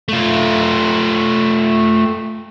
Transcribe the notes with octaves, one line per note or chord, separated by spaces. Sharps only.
A3 F4